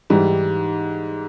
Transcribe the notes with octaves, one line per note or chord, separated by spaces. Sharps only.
G#2 E3 G3